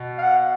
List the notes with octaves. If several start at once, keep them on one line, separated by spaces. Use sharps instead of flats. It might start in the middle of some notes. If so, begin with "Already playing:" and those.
Already playing: B2
F5
F#5